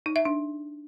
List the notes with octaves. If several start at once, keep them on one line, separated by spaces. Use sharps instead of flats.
D#4
E5
D4